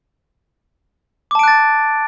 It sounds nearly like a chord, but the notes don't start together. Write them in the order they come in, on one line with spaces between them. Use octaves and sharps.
D6 A5 D7 F#6 A6